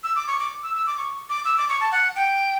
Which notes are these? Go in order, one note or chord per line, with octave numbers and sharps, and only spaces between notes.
E6
D6
C#6
D6
E6
E6
D6
C#6
D6
E6
D6
C#6
A5
F#5
G5